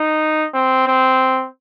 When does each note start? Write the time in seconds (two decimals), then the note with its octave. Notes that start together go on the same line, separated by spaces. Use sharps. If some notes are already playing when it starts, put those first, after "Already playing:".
Already playing: D#4
0.54 C4
0.87 C4